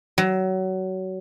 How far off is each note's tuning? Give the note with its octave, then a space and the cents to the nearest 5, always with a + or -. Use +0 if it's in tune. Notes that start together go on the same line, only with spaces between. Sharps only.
F#3 +25